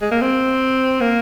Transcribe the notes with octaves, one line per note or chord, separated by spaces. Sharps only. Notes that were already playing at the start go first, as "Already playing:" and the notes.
G#3
A#3
C4
A#3